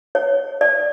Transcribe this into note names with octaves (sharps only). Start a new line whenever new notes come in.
C#5
D5